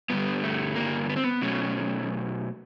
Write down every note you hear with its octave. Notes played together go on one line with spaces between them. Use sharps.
G2 D3 G3 B3
A3
A#3
B3
C4
B3
B2 F#3 A3 C#4